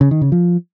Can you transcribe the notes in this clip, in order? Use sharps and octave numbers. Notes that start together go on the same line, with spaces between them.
C#3
D#3
C#3
F3